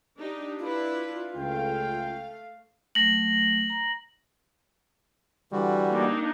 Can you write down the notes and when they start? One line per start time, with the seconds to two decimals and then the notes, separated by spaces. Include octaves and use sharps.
0.18 D4 D#4 G4
0.59 D4 E4 F4 B4
1.36 C#2 C#3 A3 F5 G5
2.95 F#3 A3 A#6 F#7
3.70 A#5
5.52 D3 E3 G3 F#4
5.92 A#3 D4 D#4